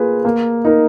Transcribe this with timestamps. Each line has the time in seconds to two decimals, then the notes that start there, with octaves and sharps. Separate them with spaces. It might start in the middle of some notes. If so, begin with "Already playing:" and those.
Already playing: A#3 F4 G#4 B4
0.25 A#3
0.65 D#4 A#4